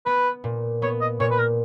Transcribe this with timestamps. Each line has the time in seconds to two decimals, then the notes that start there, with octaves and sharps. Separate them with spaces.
0.06 B3 B4
0.44 A#2
0.82 B3 C#5
1.01 D#5
1.20 A#2 C#5
1.31 B4
1.38 A#4